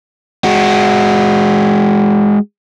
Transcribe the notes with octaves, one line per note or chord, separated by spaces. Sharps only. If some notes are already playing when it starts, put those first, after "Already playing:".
G#3 F#4